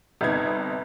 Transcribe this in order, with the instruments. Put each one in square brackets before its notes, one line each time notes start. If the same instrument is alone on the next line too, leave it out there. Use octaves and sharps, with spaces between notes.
[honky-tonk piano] G1 C3 B3 D#4 G#6